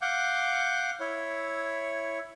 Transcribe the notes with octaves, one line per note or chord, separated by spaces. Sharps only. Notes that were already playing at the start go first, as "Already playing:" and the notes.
F5 F#5 D6 G6
E4 C#5